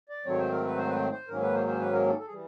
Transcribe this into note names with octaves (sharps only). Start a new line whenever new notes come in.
D5
G#2 D#3 F#3 A3 C4 C#5
C5
A#4
B4
C5
B4
C5
C5
G#2 D#3 F#3 A#3 C#4 A#4
B4
C5
C5
B4
A#4
A4
A4
G#4
E3 G3